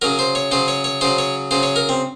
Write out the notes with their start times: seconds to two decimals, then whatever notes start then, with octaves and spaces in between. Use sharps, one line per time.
0.02 C#3 F#3 A#4
0.19 C5
0.35 C#5
0.51 C#3 F#3 C5
0.68 C#5
0.84 C#5
1.01 C#3 F#3 C5
1.18 C#5
1.51 C#3 F#3 C5
1.63 C#5
1.76 A#4
1.89 C4